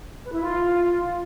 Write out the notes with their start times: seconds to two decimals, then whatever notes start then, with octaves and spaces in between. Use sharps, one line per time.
0.24 B4
0.33 E4
0.42 F4